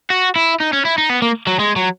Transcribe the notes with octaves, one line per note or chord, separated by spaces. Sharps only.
F#4
E4
D#4
C#4
E4
D#4
B3
A#3
F#3
G#3
F#3